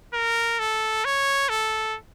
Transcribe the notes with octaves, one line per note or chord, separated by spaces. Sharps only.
A#4
A4
C#5
A4